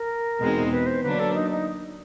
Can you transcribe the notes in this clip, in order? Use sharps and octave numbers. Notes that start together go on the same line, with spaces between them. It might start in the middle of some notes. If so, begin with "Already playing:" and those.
Already playing: A#4
E2 B2 G#3 C4 D#4
B4
C5
D3 F#3 A#3 D4 B4
A4
D#4
D#4